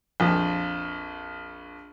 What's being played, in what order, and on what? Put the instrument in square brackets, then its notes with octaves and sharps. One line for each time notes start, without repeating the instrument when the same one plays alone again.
[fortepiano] A#1 F2